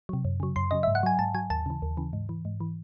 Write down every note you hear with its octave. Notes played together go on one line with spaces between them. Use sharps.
C3 F#3
F#2
C#3 F#3
F#2 C6
C#3 F#3 D#5
G#2 E5
F#5
F#3 G#5
G#2 A5
F#3 G#5
D#2 A5
C#3 E3
D#2
C#3 E3
G#2
E3
G#2
E3